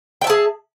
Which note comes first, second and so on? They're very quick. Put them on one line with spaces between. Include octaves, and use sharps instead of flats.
G5 E5 A5 G#4